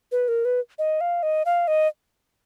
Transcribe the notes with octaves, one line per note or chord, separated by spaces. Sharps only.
B4
A#4
B4
D#5
F5
D#5
F5
D#5